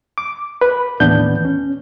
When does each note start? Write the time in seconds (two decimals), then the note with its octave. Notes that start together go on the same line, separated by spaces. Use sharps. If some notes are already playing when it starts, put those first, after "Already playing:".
0.18 D6
0.61 B4
1.00 D#2 A2 E3 B3 D4 G6
1.45 C#4